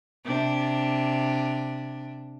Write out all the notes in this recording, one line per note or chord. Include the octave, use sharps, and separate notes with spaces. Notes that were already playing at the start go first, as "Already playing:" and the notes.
C3 D4